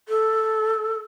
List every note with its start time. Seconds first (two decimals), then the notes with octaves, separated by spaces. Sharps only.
0.09 A4